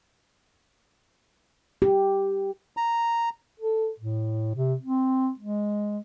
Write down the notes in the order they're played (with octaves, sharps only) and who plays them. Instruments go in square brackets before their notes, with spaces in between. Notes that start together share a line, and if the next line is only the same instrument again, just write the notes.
[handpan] G4
[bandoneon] A#5
[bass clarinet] A4
A2
C3
C4
G#3